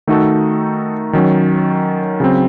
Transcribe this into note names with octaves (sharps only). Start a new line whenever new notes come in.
D#3 A3 D#4 F#4 A4
D#3 F#3 C#4
C#3 F#3 C4